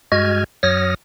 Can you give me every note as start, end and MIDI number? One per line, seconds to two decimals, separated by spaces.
0.12 0.44 43
0.12 0.44 56
0.12 0.44 66
0.12 0.44 75
0.12 0.44 89
0.12 0.44 92
0.63 0.94 42
0.63 0.94 54
0.63 0.94 73
0.63 0.94 87
0.63 0.94 89
0.63 0.94 94